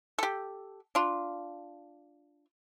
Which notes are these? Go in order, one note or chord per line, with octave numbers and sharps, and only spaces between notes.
G4 A4
D4 F4